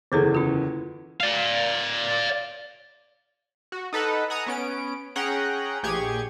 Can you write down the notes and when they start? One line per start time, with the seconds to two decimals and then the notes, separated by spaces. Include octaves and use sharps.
0.12 F#1 E2 D3 G#4 A4 G#6
0.35 C#4 F4
1.21 D5 F5
3.72 F#4
3.93 D#4 A4 B4 F#5
4.30 F#5 G#5 A#5 D#6
4.47 B3 C#4 D7
5.16 C#4 G#4 F#5 G5 A#5
5.83 A#1 G4 G#4 C#6 G#6